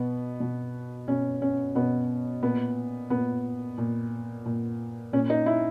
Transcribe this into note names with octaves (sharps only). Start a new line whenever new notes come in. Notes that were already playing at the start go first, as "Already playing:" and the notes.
Already playing: B2 B3
B2
B2 C#4
C#4
B2 B3
A#2 B3
A#2 B3
A#2
A#2
A#2 C#4
D#4
E4